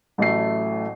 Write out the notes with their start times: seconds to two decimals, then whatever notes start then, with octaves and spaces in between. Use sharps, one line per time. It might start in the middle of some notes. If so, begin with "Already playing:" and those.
0.18 A1 A2 F#3 A3 C7